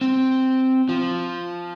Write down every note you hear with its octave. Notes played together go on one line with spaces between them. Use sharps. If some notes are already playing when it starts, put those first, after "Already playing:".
C4
F3